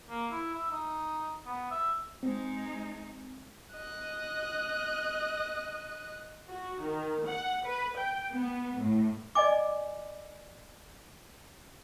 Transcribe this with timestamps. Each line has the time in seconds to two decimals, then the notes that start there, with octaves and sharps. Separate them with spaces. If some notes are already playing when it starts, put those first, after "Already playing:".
0.10 A#3
0.31 E4
0.54 E5
0.71 D#4
1.46 B3
1.71 E5
2.23 G#3 C4 D#4
3.74 D#5 F#6
6.48 F#4
6.80 D#3
7.27 F#5
7.64 B4
7.97 G5
8.32 B3
8.80 A2
9.35 D5 D#5 G#5 D6